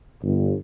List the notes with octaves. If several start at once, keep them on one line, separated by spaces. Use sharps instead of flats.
G1